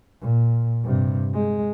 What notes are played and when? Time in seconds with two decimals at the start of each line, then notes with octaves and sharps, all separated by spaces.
0.21 A#2
0.84 G2 C3
1.33 G#3